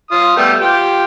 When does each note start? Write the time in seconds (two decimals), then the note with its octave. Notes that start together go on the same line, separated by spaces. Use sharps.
0.11 F4 D#6
0.37 G3 A3 B3
0.60 F4 G4